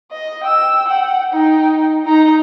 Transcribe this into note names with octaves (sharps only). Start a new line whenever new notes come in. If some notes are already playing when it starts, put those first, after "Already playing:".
D#5
G5 E6
F#5 G5
D#4 G5
D#4 A#5